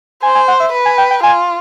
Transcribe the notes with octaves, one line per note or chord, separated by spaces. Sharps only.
C5 G#5
G#5
F#5
E5
B4
G#5
G5
G5
F4 G#5